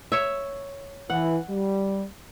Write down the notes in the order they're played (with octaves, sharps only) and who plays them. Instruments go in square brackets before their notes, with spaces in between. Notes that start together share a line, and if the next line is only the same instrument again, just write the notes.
[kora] C#5 E5
[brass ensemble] E3 [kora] F#5
[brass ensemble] G3